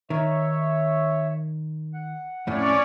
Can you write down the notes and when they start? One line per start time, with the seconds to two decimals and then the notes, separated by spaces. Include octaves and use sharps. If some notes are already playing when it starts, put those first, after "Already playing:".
0.10 D#3 C#5 E5
1.94 F#5
2.47 F2 A2 C#4 C#5 D5